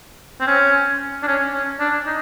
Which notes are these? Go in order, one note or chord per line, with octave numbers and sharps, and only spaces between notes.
C4
C#4
D4
C#4
C#4
D4
D#4